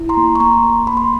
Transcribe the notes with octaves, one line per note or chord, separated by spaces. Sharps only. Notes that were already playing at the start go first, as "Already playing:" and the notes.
Already playing: E4
A#5 C6
A#3
C#6
A#3 A#5 C6
A#3
A#3 B5
C6